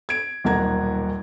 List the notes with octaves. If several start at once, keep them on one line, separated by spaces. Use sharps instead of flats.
G#6 D7
D#1 B1 A#3 F#5 A#5 G#6